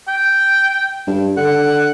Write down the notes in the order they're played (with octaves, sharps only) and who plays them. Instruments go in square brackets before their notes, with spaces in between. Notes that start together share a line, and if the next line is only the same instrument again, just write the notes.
[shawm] G5
[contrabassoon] G2
[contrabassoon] D3 [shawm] F#5